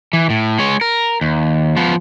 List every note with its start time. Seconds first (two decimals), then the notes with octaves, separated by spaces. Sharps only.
0.13 E3
0.30 A2
0.59 G#3 C#5
0.81 A#4
1.21 D#2
1.77 F3 B3